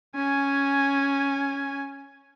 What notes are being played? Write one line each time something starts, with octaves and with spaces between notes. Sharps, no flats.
C#4 G#5